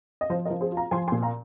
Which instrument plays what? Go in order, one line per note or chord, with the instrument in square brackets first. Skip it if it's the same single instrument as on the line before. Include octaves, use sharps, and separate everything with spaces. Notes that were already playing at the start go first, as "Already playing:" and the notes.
[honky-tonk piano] D#5
F3 C5 F5
A#4 D#5
F3
G#4 C5
F4
F5 A#5
F3 G#5 C6
G#5 C6
A#2
F5 A#5